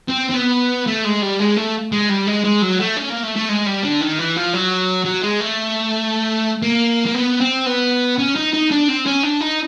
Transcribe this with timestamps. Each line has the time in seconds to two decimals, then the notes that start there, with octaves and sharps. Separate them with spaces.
0.09 C4
0.31 C4
0.35 B3
0.87 A3
1.05 G#3
1.23 G3
1.40 G#3
1.57 A3
1.92 G#3
2.09 G3
2.27 G#3
2.44 G#3
2.62 F#3
2.79 A3
2.96 C#4
3.09 A#3
3.23 A3
3.36 A3
3.49 G#3
3.66 G3
3.83 D3
4.01 D#3
4.18 E3
4.36 F3
4.53 F#3
5.05 F#3
5.23 G#3
5.40 A3
6.62 A#3
7.06 A#3
7.15 B3
7.41 C4
7.66 B3
8.19 C#4
8.36 D#4
8.54 D#4
8.71 D4
8.89 C4
9.06 C#4
9.23 D4
9.41 D#4